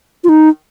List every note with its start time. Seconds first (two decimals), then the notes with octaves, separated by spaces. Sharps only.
0.24 F4
0.29 D#4